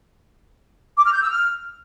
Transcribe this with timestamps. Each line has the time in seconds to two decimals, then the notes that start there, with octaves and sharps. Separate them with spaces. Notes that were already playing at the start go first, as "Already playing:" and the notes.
0.96 D6
1.04 F6
1.13 G6
1.21 E6
1.29 F6